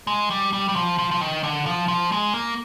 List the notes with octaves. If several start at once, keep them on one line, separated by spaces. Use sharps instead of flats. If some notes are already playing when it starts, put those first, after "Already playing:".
G#3
G3
G3
G3
F3
F3
F3
D#3
D3
F3
F3
G#3
A#3